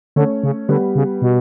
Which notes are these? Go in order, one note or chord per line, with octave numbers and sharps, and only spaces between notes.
D3 A3 C#4
C#3
D3 G3 B3
C#3
B2